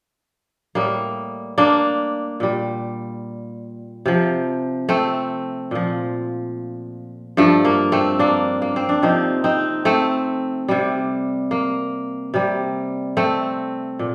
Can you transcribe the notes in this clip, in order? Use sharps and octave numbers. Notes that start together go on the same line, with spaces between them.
A2 G3 A#3
A#3 D4
A#2 G3
C3 F3
A3 C4
A#2 F3
G2 F3 A3
A#3
A3 C4
A#3 D4
A#3
C4
D4
C3 F3 C4 D#4
C4 D#4
A3 C4
C3 G3
A#3
C3 G3
A3 C4
A#2